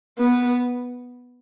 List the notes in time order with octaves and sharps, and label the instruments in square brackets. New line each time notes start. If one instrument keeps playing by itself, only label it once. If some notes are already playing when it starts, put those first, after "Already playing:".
[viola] B3